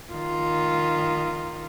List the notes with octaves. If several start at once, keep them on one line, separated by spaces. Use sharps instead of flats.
D#3 F4